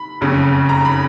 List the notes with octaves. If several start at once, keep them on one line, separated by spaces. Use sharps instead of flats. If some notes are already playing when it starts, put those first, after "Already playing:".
Already playing: B5
F#1 F2 C#3
A#5
B5